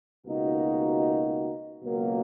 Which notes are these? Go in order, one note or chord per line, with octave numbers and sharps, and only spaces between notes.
C#2 B2 A#3 D#4 F#4
C#2 B2 F#3 A#3